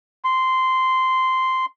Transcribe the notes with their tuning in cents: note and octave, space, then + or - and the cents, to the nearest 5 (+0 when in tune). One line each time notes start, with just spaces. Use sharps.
C6 -10